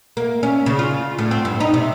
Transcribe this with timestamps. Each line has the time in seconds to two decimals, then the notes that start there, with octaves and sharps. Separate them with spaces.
0.17 A#3
0.43 C#4
0.66 C#3
0.79 F4
1.19 A2
1.31 C4
1.45 G2
1.60 D#4
1.74 C3